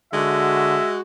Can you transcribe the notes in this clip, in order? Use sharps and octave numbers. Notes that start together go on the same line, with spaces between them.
D3 G#3 F#4 E5